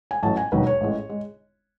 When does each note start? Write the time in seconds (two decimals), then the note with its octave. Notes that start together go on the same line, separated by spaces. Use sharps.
0.11 G#5
0.23 A1 A2 F#3 A5
0.37 G#5
0.52 E1 D#2 D#3 F#3 B4
0.67 C#5
0.81 A1 A2 G#3
1.09 G#3